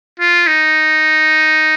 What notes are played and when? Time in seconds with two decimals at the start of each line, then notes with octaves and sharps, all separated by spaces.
0.20 F4
0.47 D#4